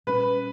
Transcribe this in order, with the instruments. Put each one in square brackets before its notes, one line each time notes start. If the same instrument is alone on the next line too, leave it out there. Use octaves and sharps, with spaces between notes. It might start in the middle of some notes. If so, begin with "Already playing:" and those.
[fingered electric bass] A#2 G3 C#4 [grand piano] B4